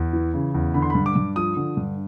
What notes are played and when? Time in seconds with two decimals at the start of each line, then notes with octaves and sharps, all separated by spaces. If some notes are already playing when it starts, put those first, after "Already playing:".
Already playing: E2
0.13 E3
0.34 C#3
0.55 E2
0.74 D3 B5
0.82 C6
0.90 G2 B5
1.06 D6
1.16 G2
1.36 F3 D#6
1.57 D3
1.77 G2